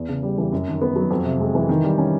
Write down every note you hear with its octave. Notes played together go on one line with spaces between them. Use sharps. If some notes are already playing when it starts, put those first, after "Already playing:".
Already playing: E2
C#3
G3
E3
F#2
D#3
B3
F#3
F2
C3
G#3
E3
D#3
G3
C#4